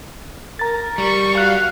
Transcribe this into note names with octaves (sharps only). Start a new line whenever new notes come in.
A#4 A#5 A6
G3 C#6
F#4 F5 F#6